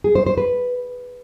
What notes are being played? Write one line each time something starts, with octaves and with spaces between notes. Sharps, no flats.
G#4
C5
C5
B4